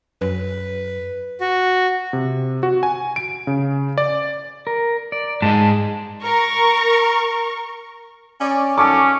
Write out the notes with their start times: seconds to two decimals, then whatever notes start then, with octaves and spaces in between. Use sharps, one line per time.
0.21 F#2 B4
1.41 F#4
2.13 C3
2.63 F#4
2.83 G#5
3.16 D7
3.47 C#3
3.98 D5
4.67 A#4
5.12 D5
5.42 G#2 G#3 A5
6.23 A#4 C#6
8.41 C#4 C#5 D5
8.78 F#2 C#4 D#4 A4 C#6 D6